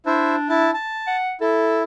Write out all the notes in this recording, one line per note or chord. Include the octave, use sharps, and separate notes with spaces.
D4 E4 C5 E5
E4 A5
A5
F#5
E4 A4